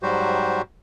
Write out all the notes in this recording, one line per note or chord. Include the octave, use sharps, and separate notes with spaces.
G#2 F#3 G3 F#4 G4 C5